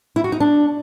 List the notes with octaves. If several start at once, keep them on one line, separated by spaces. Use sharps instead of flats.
E4
F#4
D#4
D4